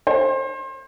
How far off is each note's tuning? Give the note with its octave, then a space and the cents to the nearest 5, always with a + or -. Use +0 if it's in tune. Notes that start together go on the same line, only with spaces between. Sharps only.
C5 +30